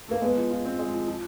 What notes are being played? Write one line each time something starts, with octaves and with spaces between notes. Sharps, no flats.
A3 A#3
G#3 B3
F3
F4
C4
G#3
F3
F3